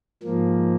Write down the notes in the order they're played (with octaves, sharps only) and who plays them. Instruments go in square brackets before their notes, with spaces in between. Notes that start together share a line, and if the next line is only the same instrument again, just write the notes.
[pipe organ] G#2 F3 A#3